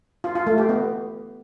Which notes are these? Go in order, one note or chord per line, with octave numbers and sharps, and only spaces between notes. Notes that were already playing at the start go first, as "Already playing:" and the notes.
F4
F4
A3
G4
B3